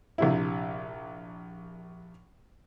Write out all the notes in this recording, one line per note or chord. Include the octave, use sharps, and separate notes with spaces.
A#1 C3 E4